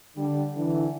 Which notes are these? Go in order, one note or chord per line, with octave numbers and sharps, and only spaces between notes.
D3 G3
D3 E3